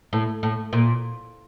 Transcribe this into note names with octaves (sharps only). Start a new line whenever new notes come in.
A2
A2
A#2